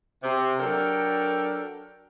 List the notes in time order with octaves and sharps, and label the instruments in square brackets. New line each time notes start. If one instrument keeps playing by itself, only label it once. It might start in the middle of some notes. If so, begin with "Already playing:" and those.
[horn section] C3
F#3 D4 A4 A#4 G5